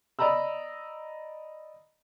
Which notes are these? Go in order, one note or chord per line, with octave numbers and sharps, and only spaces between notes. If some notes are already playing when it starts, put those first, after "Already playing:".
D5 D#5 A#5 B5 E6